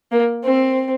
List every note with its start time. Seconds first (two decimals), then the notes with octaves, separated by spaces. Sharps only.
0.12 A#3
0.43 C4